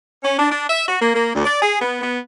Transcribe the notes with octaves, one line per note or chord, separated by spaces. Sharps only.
C#4
D4
D4
E5
F#4
A#3
A#3
D2
D5
G#4
B3
B3